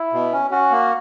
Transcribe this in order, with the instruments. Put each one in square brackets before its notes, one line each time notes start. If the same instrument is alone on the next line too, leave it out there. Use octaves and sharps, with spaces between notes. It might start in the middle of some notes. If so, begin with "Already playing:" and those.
Already playing: [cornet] E4
[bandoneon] B2
C#4
[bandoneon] C#4 [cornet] F#4
[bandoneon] A#3